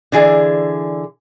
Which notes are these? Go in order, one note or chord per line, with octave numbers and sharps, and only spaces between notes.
D3 E3 G#4 D5